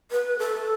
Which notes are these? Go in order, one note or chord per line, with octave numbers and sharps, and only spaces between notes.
B4
A4